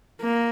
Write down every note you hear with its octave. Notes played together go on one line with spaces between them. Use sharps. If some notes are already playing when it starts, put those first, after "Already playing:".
A#3